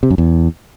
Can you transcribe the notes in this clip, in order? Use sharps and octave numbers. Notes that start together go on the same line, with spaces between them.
C3
F#2
E2